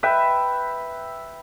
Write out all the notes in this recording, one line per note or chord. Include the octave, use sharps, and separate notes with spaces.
B4 E5 G5